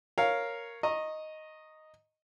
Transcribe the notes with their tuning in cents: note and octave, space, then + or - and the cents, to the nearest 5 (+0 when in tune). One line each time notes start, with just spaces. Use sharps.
A#4 +0 C#5 +0 F5 +0
D#5 +0 A#5 +0 C#6 -25